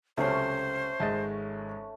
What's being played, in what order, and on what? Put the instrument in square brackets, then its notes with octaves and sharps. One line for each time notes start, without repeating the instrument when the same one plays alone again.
[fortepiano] C#2 C3 F#3 [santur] A3 C#4 [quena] C5
[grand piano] G#1 G#3 A6 [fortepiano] D#5 E5 A5